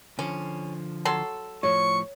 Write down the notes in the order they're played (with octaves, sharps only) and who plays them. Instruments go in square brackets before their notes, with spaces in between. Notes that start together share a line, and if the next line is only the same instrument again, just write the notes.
[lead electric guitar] D3 F3 [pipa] C#4
[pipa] F#3 A4 C6
[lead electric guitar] A2 F3 [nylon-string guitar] C#5 [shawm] C#6